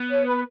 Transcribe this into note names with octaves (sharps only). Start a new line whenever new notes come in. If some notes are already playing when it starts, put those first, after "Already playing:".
Already playing: B3
C#5
B4